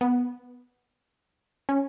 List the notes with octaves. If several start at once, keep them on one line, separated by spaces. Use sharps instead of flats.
B3
C#4